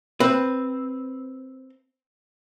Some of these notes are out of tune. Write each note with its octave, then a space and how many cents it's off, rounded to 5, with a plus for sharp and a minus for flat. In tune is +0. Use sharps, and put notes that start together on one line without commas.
C4 +0 B4 +0